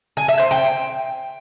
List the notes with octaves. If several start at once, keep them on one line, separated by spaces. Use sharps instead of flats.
G#5
E5
C5
G5